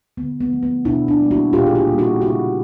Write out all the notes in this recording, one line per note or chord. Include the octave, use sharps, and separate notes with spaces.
D3 B3
B3
F3 A3
B3
B2 D4 E4
D4 E4
G3 A#3
E4 F#4
A#2 F4 G4
G#4
F4 G4
A#3
G3
E4 F#4
C#3 E4 F#4